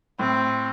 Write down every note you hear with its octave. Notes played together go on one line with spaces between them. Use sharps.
A2 C4